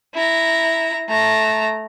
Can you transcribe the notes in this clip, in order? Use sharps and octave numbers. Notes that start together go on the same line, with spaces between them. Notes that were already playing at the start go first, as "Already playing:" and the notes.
E4 A#5
A3 A#5